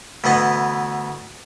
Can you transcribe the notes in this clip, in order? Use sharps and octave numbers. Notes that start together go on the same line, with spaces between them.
D2 E3 B3 D#5